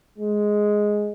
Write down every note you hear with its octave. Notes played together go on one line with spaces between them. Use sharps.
G#3